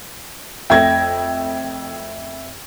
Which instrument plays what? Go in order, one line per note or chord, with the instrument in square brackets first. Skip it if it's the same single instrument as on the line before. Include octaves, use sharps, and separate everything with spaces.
[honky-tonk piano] F2 A3 A#6 [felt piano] E5 G#6 [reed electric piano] G5